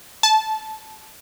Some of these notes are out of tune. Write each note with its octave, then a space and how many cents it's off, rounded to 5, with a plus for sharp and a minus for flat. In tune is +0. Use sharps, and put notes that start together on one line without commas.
A5 -20